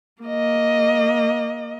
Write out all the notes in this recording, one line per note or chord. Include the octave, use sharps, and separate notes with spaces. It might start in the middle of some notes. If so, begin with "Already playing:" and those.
A#3 D#5